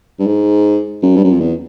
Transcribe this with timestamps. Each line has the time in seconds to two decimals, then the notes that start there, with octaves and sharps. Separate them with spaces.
0.19 G2
0.27 G#2
1.02 F#2
1.16 G2
1.24 F#2
1.32 F2
1.40 E2